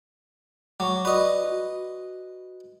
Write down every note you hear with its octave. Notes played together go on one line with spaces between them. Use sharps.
F#3 C#6 D6
F#4 B4 D5 D#5
F#4